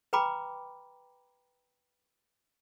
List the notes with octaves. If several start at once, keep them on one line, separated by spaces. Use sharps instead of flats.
B4 G5 A#5 B5 D6